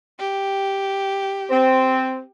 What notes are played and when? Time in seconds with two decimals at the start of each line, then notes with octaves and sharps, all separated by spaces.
0.19 G4
1.50 C4